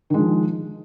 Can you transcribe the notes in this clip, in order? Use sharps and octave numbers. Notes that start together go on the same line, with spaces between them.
D#3 F3 G#3